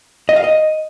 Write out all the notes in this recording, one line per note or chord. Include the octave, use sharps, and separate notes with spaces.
D#5
F5
D#5